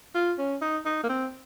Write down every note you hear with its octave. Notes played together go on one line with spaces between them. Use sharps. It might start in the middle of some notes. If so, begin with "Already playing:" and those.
F4
C#4
D#4
D#4
A#3
C4